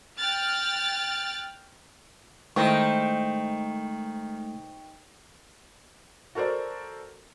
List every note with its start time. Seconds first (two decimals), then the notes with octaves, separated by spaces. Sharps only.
0.18 G5 F6 F#6 A6
2.56 D#3 G#3 A3 E4 C5 D#5 G5 C#6
6.35 F#4 A4 A#4 C5 D5